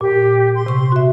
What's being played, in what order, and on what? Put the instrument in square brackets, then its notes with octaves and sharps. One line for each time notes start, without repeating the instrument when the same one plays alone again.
[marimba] A#2 [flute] G4
[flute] C6
[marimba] C3 C#6
F#4 E5